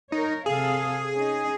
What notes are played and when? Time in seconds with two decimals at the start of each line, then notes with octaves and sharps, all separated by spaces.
0.12 D#4 A#4 C#5
0.46 C3 G#4 A4 F5
1.13 C#4 D#4